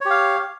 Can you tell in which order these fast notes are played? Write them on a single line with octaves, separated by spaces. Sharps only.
C#5 G4 F5